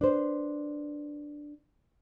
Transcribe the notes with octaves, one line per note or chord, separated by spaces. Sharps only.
D4 B4 C5